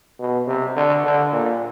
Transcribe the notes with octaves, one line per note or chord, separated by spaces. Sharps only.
B2
C3
D3
D3
A#2